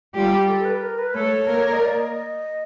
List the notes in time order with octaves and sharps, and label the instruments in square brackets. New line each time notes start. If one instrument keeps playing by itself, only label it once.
[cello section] G3 G4 [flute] F4
[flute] A4
B4
A#4
B4
[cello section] A3 A4 [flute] C#5
[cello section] A#3 A#4
[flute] D#5
D5
D#5
D#5